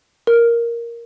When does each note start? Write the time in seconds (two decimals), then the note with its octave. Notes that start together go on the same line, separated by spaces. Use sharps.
0.27 A#4